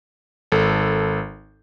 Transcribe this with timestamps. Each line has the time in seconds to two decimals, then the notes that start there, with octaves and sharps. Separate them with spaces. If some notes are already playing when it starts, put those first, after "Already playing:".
0.52 G#1 A4